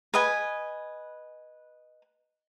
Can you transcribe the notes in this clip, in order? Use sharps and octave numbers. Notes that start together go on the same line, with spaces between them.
B4 D#5 G#5